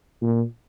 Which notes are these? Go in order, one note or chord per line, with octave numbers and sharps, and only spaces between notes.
A#2